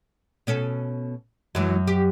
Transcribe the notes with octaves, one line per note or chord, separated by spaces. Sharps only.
B2 C#4 A4
F#2 E3 F#3 G#3
G4